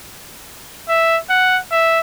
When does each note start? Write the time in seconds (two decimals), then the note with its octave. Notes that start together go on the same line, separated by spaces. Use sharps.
0.89 E5
1.30 F#5
1.72 E5